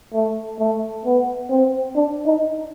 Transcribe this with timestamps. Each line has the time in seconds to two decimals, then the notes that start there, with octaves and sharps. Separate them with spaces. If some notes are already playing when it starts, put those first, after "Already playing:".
0.14 A3
0.59 A3
1.05 B3
1.50 C4
1.96 D4
2.26 D#4